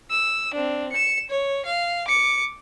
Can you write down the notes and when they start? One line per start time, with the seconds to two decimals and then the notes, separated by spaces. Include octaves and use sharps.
0.11 E6
0.54 C4 D4
0.92 C#7 E7
1.30 C#5
1.66 F5
2.08 D6 C#7